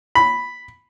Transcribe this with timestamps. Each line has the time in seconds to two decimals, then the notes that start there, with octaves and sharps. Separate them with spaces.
0.15 B5